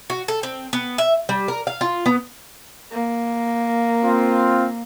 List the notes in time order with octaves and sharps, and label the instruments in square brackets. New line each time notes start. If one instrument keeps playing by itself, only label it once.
[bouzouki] F#4
A4
C4
B3
E5
G3
A#4
F5
F4
B3
[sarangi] A#3
[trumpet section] C4 F4